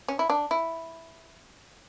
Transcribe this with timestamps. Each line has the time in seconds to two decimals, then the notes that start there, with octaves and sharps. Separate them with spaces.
0.08 C#4
0.19 E4
0.30 D4
0.51 E4